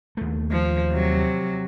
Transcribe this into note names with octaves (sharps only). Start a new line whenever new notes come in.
D#2 A3
F3
C3 F#3